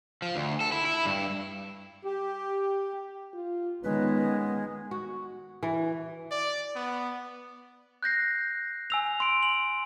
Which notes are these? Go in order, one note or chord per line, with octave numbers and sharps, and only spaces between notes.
F3
D2
A4
E4
E4
G2
G4
F4
D#3 G#3 B3 C#4 B4
F#4
E3
D5
B3
F#6 G6 A#6 C7
G#5 E6 F7
C6 D7
F#7